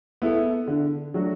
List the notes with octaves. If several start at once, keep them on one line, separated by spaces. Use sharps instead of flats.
B3 E4 A4
D3
F#3 A3 D4 F#4